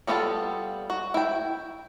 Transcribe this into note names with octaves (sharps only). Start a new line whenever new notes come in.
G3 B3 D4 F4 A4
F#4
E4 G5